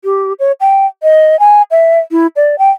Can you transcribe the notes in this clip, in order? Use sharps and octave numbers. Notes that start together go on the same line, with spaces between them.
G4
C#5
G5
D#5
G#5
E5
E4
D5
G5